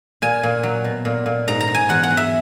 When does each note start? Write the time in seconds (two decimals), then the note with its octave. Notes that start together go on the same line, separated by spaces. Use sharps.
0.22 A#2 G#5
0.43 A#2
0.63 F#3
0.84 B2
1.05 A#2
1.26 A#2
1.48 G#2 A#5
1.60 A#5
1.68 G#2
1.75 G#5
1.89 E2 F#5
2.03 F#5
2.10 F#3
2.17 E5